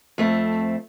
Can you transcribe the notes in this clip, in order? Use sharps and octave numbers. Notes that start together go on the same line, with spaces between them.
F2 A3 C4